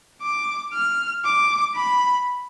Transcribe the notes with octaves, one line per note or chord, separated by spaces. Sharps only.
D6
F6
D6
B5